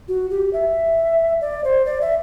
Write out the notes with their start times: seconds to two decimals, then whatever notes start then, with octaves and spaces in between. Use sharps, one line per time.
0.08 F#4
0.30 G4
0.53 E5
1.41 D5
1.64 C5
1.86 D5
2.01 E5